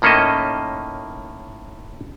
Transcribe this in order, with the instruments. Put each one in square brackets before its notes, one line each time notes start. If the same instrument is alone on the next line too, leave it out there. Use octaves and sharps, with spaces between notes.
[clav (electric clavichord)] A2 D#3 A#3 C#4 A4 D#5